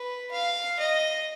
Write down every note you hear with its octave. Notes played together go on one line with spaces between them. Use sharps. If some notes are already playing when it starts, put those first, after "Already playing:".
Already playing: B4
F5
D#5